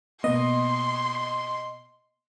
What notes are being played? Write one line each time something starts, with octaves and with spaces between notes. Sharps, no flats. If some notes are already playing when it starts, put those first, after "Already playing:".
B2 A#3 B3 D#5 C6